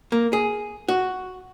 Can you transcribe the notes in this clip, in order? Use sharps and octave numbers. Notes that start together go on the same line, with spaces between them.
A#3
G#4
F#4